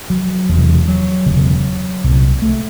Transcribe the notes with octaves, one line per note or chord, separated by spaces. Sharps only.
F#3
E1 E2 C3
F#3
E1 D2 C#3
C2 A#2
A3